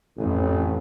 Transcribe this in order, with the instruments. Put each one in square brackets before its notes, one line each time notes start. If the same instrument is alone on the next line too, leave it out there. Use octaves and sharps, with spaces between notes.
[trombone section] A1 [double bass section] F2 A2